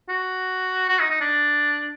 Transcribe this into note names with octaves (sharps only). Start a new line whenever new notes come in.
F#4
F#4
D#4
D#4
D4